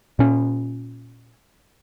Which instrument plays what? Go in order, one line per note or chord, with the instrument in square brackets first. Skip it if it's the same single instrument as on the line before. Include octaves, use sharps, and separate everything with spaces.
[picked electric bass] A#2 C#4